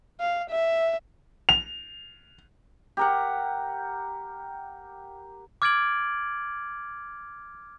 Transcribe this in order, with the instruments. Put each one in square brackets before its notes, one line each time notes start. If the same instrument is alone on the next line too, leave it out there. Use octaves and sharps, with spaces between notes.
[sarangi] F5
E5
[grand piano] F7
[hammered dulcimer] G4 A#4 F#5
[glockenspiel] D6 F6 G#6 A6 D7 F#7